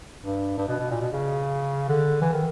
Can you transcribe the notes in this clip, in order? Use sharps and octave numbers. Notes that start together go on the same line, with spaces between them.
G2
G2
B2
B2
A#2
B2
C#3
D3
E3
D#3